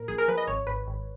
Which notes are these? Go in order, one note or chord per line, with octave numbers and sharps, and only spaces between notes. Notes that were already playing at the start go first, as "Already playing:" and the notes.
Already playing: A#2 A#4
A#1 G#4
A#4
F3 B4
D#5
G#1 C#5
G#1 B4
G#1